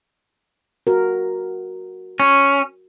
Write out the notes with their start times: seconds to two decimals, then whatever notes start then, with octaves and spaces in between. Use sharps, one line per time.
0.87 F#4 A#4
2.20 C#4